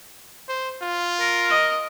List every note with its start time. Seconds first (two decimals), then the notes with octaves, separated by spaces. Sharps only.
0.49 C5
0.82 F4
1.20 A#4
1.50 D#5